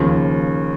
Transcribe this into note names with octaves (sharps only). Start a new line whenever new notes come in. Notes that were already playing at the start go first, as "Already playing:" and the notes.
Already playing: D#2 C#3 F3